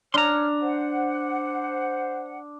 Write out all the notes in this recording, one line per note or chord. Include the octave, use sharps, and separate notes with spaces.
D4 C#5 A#5 C6 F6
C5 F#5